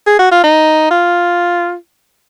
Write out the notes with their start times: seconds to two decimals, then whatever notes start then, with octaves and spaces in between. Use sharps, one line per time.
0.06 G#4
0.19 F#4
0.31 F4
0.44 D#4
0.90 F4